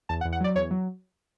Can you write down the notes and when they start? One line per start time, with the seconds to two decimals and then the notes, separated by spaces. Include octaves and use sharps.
0.09 E2 A5
0.21 F#5
0.25 E2
0.33 F#5
0.40 F#3 D5
0.56 E2 C#5
0.71 F#3